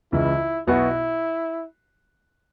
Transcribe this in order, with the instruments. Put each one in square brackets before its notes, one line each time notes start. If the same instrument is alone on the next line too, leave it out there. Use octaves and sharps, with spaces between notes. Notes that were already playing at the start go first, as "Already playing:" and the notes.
[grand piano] C#2 C#3 E3 [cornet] E4
[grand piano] B1 B2 B3 F#4 [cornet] E4